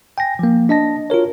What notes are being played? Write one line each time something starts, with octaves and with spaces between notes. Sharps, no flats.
G5 G#5 A#6
F3 A#3
D4 D#5 A5 A#6
F4 F#4 A#4 C#5